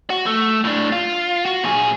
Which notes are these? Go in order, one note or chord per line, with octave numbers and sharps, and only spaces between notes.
F#4
A3
A2 D4
F4
F#4
A#2 G#4